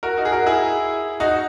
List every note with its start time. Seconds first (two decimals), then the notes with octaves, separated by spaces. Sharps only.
0.03 F#4 A#4
0.17 D#4 F#4
0.25 G#4
0.32 F#4 A#4
0.46 E4 G#4
1.20 D#4 F#4